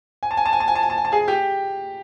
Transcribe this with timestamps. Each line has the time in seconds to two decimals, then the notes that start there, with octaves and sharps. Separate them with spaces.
0.23 G#5
0.31 A5
0.37 G#5
0.46 A5
0.53 G#5
0.60 A5
0.68 G#5
0.75 A5
0.83 G#5
0.90 A5
0.98 G#5
1.05 A5
1.12 G#4 G#5
1.28 G4 G5